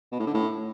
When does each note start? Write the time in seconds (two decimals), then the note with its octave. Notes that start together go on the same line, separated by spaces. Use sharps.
0.12 B2
0.19 A2
0.27 D3
0.34 A2